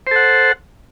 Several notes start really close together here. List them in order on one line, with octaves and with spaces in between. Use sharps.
C5 A4 F#5